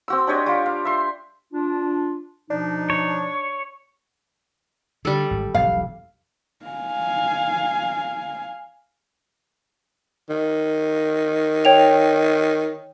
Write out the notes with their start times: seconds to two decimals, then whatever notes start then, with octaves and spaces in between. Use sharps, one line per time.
0.08 C4 F#4 E6
0.27 D4 G4 C#5 D#5
0.46 G3 F4 D6
0.66 F5
0.85 E5 C6
1.53 D4 F4
2.50 B2 F3 D4 D#4
2.90 C#5
5.05 D3 G3 A4
5.31 G#1
5.55 E1 B1 F2 F5
6.66 F5 G#5
10.30 D#3
11.65 C#5 G5 F7